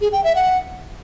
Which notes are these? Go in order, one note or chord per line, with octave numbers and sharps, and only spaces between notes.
G#4
G5
E5
F#5